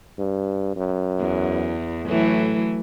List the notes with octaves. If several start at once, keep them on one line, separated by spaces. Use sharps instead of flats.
G2
F#2
E2
A2 E3 F#3 A3